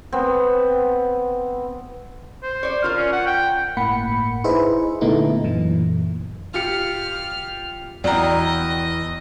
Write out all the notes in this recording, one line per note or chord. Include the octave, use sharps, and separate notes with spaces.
B3 C4
C5
C#5 D5
F4 A#4
C#4
F#5
G5
G1 A2 A#3 F#5 B5 C#7
D#4 E4 G#4 B4 C5 E5
A#2 D3 A3 B3 D#4 E4
F#2 A#2 E3
F4 G4 F6 C#7
E2 F#4 D5 D#5 G5 A#5